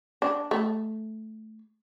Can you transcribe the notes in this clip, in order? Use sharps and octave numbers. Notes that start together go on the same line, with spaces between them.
D4
A3